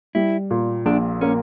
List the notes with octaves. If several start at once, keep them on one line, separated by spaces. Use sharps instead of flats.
G3 E4
A#2
A#1 D4
A#3 C#4